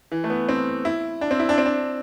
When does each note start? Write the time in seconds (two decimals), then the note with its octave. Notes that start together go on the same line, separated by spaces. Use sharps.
0.12 E3
0.24 A3
0.30 B3
0.49 C4
0.85 E4
1.21 D4
1.31 C4
1.40 E4
1.49 D4
1.58 C4
1.66 D4